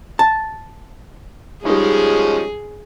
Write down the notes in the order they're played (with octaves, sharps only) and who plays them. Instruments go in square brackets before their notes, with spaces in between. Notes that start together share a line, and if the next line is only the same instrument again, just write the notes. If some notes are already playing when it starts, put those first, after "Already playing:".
[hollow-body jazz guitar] A5
[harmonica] F3 G#3 C#4 [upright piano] G3 D#4 [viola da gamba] G#4